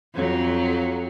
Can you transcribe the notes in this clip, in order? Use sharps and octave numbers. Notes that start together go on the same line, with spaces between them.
F2 F#3